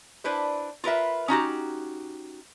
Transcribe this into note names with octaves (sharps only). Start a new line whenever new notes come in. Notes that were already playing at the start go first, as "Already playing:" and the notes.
D4 E4 B4 C5
F4 A#4 B4 E5
C#4 D#4 F#4 G4